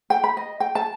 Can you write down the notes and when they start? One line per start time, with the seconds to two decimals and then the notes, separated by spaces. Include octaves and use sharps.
0.10 G5
0.24 B5
0.37 D#5
0.60 G5
0.75 A5